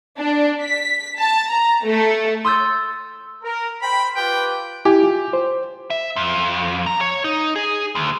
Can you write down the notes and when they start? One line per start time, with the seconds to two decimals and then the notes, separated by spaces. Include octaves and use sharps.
0.18 D4
0.62 B6
1.19 A5
1.50 A#5
1.85 A3
2.45 C6 D#6 E6 G6 A6
3.44 A#4
3.82 C5 G5 B5
4.16 F4 G4 B4 G5
4.85 E4 G4 G#5 D6
5.02 F4
5.33 C5
5.90 E5
6.16 F2
6.86 A#5
7.01 C#5
7.24 D#4
7.56 G#4
7.95 D2